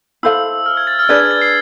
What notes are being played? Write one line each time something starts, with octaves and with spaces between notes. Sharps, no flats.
E4 A4 C5 F5 E6
F6
G#6
A6
F6
D4 G#4 B4 D5 G#6
G#6
A6
C7